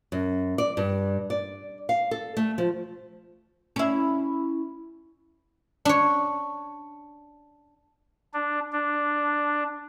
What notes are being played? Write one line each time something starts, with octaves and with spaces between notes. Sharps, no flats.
F#2
D5
G2
D5
F5
A4
A3
F3
C#4 E4
D4 C#5
D4
D4